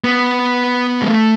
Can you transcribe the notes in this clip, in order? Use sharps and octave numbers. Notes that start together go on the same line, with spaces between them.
B3
G#3
A3